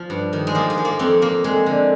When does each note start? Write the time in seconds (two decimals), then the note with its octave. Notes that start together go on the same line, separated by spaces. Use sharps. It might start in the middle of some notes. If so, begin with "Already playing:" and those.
Already playing: F3
0.10 G2
0.33 D#3
0.47 G#3
0.55 F3 A#3
0.70 G#3
0.77 F3
0.85 A#3
0.99 F2 C4
1.22 F2 A#3
1.44 F2 G#3
1.66 D3